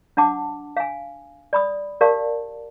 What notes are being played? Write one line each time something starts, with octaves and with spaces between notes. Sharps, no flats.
D4 F#5 A5 D6
F5 G#5
D5 B5 D#6
G4 A#4 D5 F5 A5